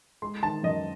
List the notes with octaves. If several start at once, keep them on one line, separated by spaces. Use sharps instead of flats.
G#3 C6
D#3 A5
F#2 D#5